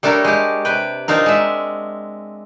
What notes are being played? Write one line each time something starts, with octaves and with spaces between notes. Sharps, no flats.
G3 A3 D4 A4 A#4 C#5
G#3 G4
C3 B4 G5
C4 D4 D#4 F4 A#4
G#3 E5